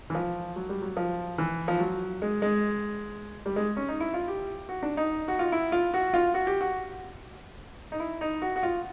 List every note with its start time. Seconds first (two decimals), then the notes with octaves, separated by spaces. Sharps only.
0.10 E3
0.15 F3
0.56 F#3
0.69 G3
0.82 F#3
0.97 F3
1.38 E3
1.68 F3
1.80 F#3
2.22 G#3
2.42 G#3
3.46 G3
3.56 G#3
3.77 C#4
3.88 D#4
4.00 E4
4.14 F4
4.28 G4
4.69 F#4
4.83 D4
4.97 D#4
5.28 F#4
5.39 F4
5.52 E4
5.72 F4
5.94 F#4
6.14 F4
6.34 F#4
6.47 G4
6.61 F#4
7.92 D#4
8.00 E4
8.21 D#4
8.42 F#4
8.56 F#4
8.63 F4